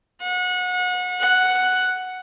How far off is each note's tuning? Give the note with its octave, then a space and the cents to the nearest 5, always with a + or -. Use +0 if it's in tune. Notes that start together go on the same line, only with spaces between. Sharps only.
F#5 -30
F#5 +0